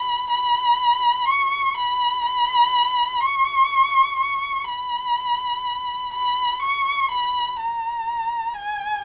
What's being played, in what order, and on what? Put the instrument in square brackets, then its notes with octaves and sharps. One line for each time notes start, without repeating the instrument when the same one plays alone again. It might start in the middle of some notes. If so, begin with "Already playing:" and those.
Already playing: [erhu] B5
B5
C#6
B5
B5
C#6
C#6
B5
B5
C#6
B5
A#5
G#5